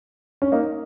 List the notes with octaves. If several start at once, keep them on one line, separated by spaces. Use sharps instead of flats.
C#4
A#3 D#4